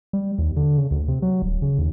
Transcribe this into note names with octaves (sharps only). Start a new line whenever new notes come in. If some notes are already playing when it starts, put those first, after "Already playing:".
G3
D#2
D3
C#3
D2
C3
F#3
D1
C#3
D#2